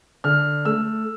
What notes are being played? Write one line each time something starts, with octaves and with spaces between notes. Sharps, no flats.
D3 F6
A3 E6